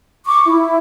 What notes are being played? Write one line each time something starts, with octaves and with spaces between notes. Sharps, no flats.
C#6 D6
E4